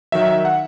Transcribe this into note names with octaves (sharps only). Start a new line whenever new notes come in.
D#3 F#3 E5
F#5